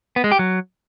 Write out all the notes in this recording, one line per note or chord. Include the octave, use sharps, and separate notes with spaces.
B3
G#3
G4
F#3